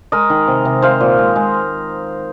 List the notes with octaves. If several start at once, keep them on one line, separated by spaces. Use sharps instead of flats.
G#3 A#4 D#5
D#3
C3
C3
G#3 C5 F5
A#2
G#3
G#3